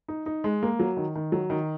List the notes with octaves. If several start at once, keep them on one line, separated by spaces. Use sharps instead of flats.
D#4
D#4
G#3
A#3
F#3
D#3
D#3
F#3
D#3